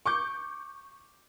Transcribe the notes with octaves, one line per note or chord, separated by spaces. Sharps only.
C#6 D6 G6